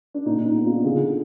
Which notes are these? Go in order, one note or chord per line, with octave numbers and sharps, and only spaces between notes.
D4
A#2 D#4
D#4
B3
D4 F4
D3 F4 G#4